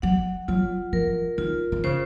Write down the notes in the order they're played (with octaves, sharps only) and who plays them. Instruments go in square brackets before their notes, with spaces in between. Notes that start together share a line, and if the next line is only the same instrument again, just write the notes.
[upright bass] F#3 [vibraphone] F#5
[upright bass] F#3 [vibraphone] F4
[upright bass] F3 [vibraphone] A#4
[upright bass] D#3 [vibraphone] F4
[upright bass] D#3
[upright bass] C#3 [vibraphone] C5